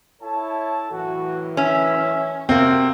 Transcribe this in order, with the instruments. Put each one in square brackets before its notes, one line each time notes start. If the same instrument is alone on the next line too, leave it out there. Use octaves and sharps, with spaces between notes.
[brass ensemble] E4 A4 A5 [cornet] C#5
[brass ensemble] F#2 A2 E3 [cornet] F#4
[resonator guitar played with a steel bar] C#4 [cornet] E5
[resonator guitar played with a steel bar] C3 A#3 [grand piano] C4 [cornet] F#4